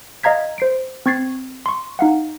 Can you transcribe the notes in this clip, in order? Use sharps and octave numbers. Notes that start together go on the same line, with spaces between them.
D#5 F5 A#5 G#6 B6
C5 C7 D7
C4 C#6 G#6 A6 C7
C6 C#6
D#4 F5 F#5